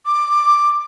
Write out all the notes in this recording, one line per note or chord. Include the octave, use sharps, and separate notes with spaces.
D6